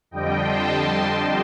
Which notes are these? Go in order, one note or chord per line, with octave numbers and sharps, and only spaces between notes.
F2 D3 G3 D#5 G5
A5 C6